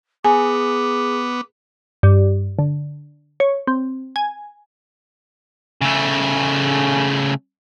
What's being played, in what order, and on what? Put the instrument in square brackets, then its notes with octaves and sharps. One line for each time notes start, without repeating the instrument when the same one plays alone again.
[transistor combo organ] B3 [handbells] G#4 [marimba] G#5 [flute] D6
[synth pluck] G2
D3
C#5
C4
G#5
[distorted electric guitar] C#3 A3